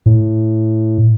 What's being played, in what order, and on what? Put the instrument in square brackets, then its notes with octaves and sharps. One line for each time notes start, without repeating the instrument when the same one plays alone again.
[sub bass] A2